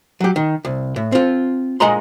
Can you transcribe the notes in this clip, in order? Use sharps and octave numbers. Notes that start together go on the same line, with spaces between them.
F#3 G4
D#3
C2
A2
C4 F4
A#2 G#3 D#5 A#5 C6